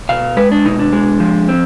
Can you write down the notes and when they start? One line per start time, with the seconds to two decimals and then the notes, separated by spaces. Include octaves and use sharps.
0.09 B2 F5
0.37 G#3 B4
0.52 D4
0.65 B2 D#4
0.79 D4
0.93 G#3
1.20 F3
1.49 C4